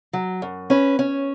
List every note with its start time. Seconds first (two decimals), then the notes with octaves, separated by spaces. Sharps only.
0.13 F#3
0.42 F#2
0.70 C#4 B4
0.99 C#4